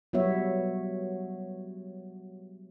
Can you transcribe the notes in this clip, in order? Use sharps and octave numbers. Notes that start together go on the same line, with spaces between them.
F#3 G3 B3 F#4 C#5 E5